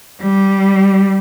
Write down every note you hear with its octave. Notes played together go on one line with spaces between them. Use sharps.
G3